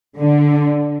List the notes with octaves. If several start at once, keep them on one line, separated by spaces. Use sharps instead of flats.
D3